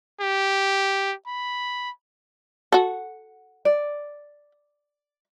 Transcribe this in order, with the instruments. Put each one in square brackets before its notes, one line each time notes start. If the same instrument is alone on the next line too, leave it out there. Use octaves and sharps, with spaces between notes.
[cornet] G4
B5
[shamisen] F#4 A4 [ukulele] F#5
[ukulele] D5